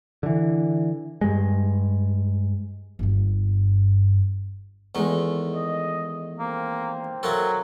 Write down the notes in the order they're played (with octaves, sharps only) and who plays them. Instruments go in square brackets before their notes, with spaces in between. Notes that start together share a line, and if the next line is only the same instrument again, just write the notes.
[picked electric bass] D3 E3
G2 G#3
[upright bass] G1 G2
[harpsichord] E2 A3 [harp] D#3 G#3
[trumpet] D#5
[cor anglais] A#3 [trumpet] C4
[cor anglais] F#3 [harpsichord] E4 F4 A4 [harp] A#4